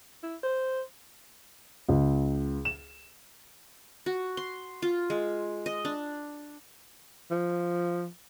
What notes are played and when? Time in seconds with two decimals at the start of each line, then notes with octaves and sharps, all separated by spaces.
0.23 E4
0.43 C5
1.89 C#2
2.65 E7
4.06 F#4
4.37 C6
4.82 F4
5.10 G#3
5.66 D#5
5.85 D4
7.31 F3